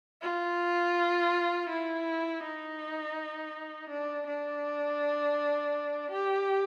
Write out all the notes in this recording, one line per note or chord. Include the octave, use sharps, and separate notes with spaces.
F4
E4
D#4
D4
D4
G4